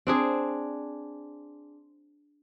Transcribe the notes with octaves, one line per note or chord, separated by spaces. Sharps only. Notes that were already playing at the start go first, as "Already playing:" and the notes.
C4 D4 G#4